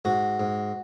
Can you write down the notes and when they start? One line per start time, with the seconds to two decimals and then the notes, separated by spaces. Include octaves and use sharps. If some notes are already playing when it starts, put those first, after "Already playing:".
0.05 G#2 F#4
0.39 G#2